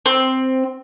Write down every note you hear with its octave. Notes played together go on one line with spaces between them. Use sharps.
C4